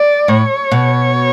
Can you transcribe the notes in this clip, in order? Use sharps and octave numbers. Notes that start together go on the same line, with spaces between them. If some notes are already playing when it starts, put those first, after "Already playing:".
Already playing: D5
A2 C#5
B2